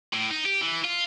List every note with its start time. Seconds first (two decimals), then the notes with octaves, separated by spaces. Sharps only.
0.13 A2
0.31 D#4
0.45 G4
0.61 E3
0.84 F4